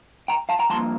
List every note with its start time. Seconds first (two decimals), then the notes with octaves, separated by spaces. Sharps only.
0.28 G5 A#5
0.49 F5 A5
0.59 G5 A#5
0.70 G2 F3 A#3 A5 C6